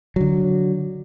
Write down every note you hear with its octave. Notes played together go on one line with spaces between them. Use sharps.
D3 F#3